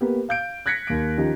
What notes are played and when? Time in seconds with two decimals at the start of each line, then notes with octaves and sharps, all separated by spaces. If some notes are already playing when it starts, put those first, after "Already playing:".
0.01 A#3 B3 G4
0.29 F5 G6 D7
0.66 F#6 G#6 A#6 B6 C#7
0.87 D#2 D7
1.17 D#3 F3 C#4 G4